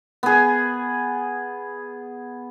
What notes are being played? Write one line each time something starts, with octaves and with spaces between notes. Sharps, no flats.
B3 G#4